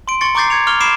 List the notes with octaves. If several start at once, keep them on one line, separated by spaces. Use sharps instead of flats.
C6 D7
C6 C#6 A6 C#7
A#5 C#6 D6 G6 A6 C7
G#6 C#7 F7
C#6 D6 F6 F7 G7
B5 D6 C7 D7 E7